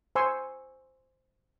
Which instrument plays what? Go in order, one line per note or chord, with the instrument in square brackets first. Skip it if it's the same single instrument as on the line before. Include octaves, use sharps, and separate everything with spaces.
[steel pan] C5 G#5 C6 C#6 E6